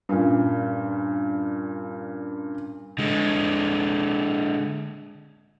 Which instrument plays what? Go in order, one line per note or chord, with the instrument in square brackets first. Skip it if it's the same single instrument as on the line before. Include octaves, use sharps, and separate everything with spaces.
[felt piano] G2 A#2 C#4
[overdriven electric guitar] D3 G#3